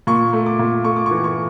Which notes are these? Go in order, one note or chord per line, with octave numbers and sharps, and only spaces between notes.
A#2 C#6
A3
D6
A#2
A3 C#6
D6
C#6
E3
C#6